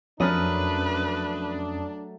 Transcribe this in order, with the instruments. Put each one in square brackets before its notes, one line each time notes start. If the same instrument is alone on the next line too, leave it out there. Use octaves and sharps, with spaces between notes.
[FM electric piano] F2 C#4 D#6 [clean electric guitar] F#3 A3 A#4 [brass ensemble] D4 [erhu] B4